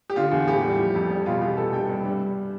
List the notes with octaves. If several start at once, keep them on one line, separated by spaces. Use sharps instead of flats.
G4
D3 F4
E2
A2 G4
G3
F3
F2
G3
B2 F4
E2 G4
C3 A4
G2 G5
G2
G3